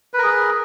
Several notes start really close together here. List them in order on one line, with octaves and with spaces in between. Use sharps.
B4 A#4 G#4